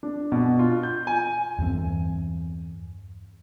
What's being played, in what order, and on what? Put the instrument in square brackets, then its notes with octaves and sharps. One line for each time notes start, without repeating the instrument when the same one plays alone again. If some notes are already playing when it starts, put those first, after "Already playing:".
[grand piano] D4
B2
F4
G6
G#5
[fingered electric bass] E2 G2 E3 C4